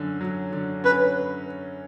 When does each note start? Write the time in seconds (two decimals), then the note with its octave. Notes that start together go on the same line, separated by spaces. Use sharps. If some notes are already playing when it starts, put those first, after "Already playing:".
Already playing: F#2 D3 C#4
0.21 F#3
0.53 D3
0.84 C#4 B4